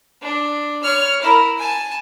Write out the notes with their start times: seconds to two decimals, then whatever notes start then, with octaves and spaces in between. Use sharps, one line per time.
0.22 D4
0.83 C#5 F6
1.22 E4 A#4
1.58 G#5 A5